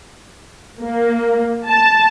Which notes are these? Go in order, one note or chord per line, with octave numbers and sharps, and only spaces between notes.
A#3
A5